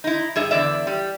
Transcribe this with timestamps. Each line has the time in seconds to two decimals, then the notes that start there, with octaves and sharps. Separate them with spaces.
0.04 D#4 E4
0.36 G2 G#4 E5
0.51 E2 D3 G3 D5 E5
0.87 G3